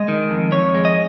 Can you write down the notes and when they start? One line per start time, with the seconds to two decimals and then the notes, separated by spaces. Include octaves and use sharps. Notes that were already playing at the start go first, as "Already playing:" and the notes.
Already playing: G#3 D#5
0.08 D#3
0.30 F2
0.52 F2 C#5
0.74 G#3
0.85 D#5